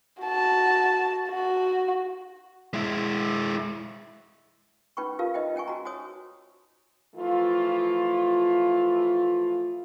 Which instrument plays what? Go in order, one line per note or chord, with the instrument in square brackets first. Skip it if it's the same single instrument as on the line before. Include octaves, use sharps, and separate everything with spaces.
[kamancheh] F#4 A5
F#4
[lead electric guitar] G#3 E4
[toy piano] C#4 D#4 B4 G5 B5 C#6
F4 G4 A#4 B4 F5 A5
D#4 B4 C5 D#5 E5 G5
C#4 G5 G#5 C#6
F#4 A5 A#5
F#4 C5 C#5 G#5 D#6
[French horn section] E3 F3 A3 F4